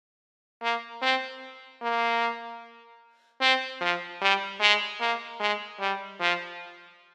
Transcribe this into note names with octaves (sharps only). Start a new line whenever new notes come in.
A#3
C4
A#3
C4
F3
G3
G#3
A#3
G#3
G3
F3